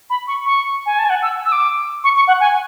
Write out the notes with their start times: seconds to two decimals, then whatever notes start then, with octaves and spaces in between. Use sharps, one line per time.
0.10 B5
0.27 C#6
0.46 C#6
0.86 G#5
0.99 A5
1.05 G#5
1.10 F#5
1.22 E6
1.45 E6
1.52 D6
2.04 C#6
2.16 C#6
2.28 F#5
2.40 G#5